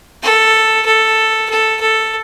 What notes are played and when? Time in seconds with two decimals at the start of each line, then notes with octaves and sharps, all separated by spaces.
0.23 A4
0.86 A4
1.50 A4
1.81 A4